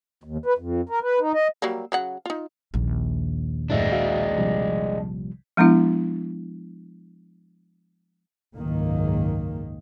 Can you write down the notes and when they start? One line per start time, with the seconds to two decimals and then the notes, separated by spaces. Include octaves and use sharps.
0.24 D#2
0.46 B4
0.58 F2
0.89 A#4
1.02 B4
1.20 D#4
1.34 D#5
1.62 F#3 G3 A#3
1.92 C#3 F#3 F#5
2.26 D#4 F4
2.74 A#1 D#2
3.70 F#2 A2 G#3 D4 E5
3.92 F#4 E5 F5
4.37 C3 F3 G3
5.57 F3 G#3 B3 D4 E4
8.55 F#1 C#2 G#2 D#3 A#3